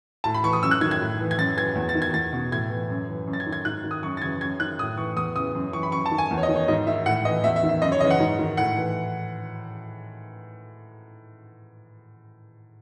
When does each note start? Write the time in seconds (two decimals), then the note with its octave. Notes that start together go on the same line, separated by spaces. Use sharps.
0.24 A2 A5
0.34 B5
0.44 E3 C#6
0.53 D#6
0.63 F#2 E6
0.71 F#6
0.81 D#3 G#6
0.91 G#6
1.01 A2
1.20 E3
1.31 G#6
1.38 F#2 A6
1.57 E3 G#6
1.75 E2
1.89 A6
1.95 D#3
2.02 G#6
2.14 E2 A6
2.33 B2
2.52 A2 G#6
2.70 E3
2.90 F#2
3.09 E3
3.27 F#2
3.33 A6
3.40 G#6
3.46 D#3
3.53 G#6
3.65 G#2 F#6
3.84 D#3
3.91 D#6
4.03 F#2 C#6
4.17 A6
4.22 C#3 E3 G#6
4.41 F#2 G#6
4.60 D#3 F#6
4.79 A2 D#6
4.97 E3 C#6
5.16 E2 D#6
5.35 C#3 D#6
5.39 E3
5.55 F#2
5.73 E3 C#6
5.83 B5
5.92 F#2 C#6
6.06 A5
6.11 D#3
6.18 G#5
6.31 E2
6.38 C#5
6.43 D#5
6.49 D#3
6.56 C#5
6.68 G#2 D#5
6.87 D#3 E5
7.06 A2 F#5
7.25 E3 D#5
7.44 E2 E5
7.56 E5
7.63 D#3
7.69 E5
7.82 F#2 D#5
7.92 C#5
8.01 C#3 E3 D#5
8.10 F#5
8.20 G#2
8.39 D#3
8.57 A2 F#5
8.77 E3